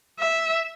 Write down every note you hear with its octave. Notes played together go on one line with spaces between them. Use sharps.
E5